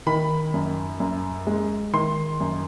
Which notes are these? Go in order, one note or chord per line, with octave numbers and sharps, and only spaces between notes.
D#3 B5
F#2
F#2
G#3
D#3 C6
F#2